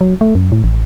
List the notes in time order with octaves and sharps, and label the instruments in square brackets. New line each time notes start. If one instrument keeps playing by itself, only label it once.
[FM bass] F#3
A3
F#2
A2
A1